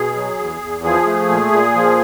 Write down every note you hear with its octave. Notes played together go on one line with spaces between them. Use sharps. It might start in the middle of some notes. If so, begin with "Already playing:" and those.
Already playing: B2 G#4
F#3
E2
E2
F3 G#4
A3
A#2
A#2
F3